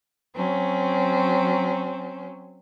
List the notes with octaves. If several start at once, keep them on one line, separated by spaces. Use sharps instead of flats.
F#3 C4 C#4